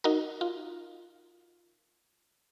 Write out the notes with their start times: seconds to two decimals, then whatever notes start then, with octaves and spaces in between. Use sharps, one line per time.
0.04 D#4 F#4 A#4
0.41 F4